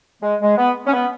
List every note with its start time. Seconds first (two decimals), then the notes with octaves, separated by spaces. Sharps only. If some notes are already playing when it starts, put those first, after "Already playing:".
0.23 G#3
0.41 G#3
0.58 B3
0.87 C#4
0.93 B3